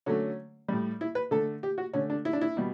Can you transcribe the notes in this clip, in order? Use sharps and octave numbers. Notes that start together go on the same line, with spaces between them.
D3 F#3 A3 C#4
A2 G3
E4
B4
D3 A3 A4
G4
F#4
D3 A3 C#4
D4
E4
D4
E4
B2 G3